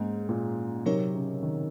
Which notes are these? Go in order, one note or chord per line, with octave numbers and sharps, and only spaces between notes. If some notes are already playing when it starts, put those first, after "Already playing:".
Already playing: G#2 A#3 C#4 G#4
A#2
C3 F#3 C4 D#4 A#4 C#5
C#3
D#3